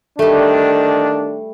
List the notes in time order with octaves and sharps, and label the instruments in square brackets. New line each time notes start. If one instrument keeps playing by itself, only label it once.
[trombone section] D#3 D4 [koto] G3 A3